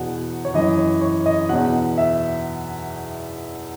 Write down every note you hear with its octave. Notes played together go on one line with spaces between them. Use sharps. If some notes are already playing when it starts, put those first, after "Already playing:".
Already playing: E2 B2 F#5
C#5
F#2 E3 D#5
C#5
C#5
D#5
E2 B2 F#5
E5